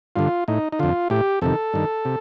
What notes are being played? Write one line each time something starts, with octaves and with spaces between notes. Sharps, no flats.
G2 D3 F4
A2 D#4
D#4
F2 D3 F4
A2 G4
F2 C3 D#3 A4
G2 D#3
C3